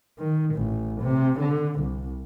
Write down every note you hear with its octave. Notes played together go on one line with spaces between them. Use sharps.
D#3
A1
C3
D3
C2